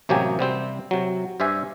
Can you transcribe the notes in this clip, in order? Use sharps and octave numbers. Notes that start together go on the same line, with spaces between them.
A1 C3 F#3 A#3 G4 G#5
C3 G3 C4 C5
C3 F#3
G2 C5 D5 E5 G#5